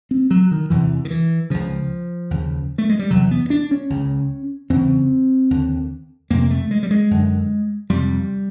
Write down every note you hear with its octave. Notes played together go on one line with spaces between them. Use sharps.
C4
F#3
D#3
E2 C3 E3
D#3
E3
C#2 C#3 F3
D#2 C#3
A3
G#3
G3
E2 C3 F#3
B3
D4
C#4
C#2 C#3
E2 C#3 C4
D#2 D3
F2 C3 A#3
A3
G#3
G3
G#3
F#2 D3
F2 C3 G3